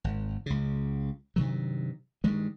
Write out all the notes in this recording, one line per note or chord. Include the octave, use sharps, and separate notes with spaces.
G#1
C#2 C#3
G2 C3 D#3 F#3
G2 D#3 G#3